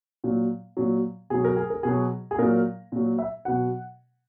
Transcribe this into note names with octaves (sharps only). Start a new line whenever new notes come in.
A#2 F#3
A#2 F#3
B2 F#3 G#4
A#4
G#4
A#4
B2 F#3 G#4
G#4
A#2 F#3 A#4
A#2 F#3
E5
B2 F#3 F#5